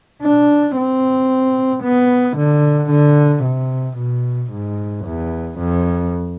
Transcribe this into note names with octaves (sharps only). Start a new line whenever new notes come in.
D4
C4
B3
D3
D3
C3
B2
G#2
E2
F2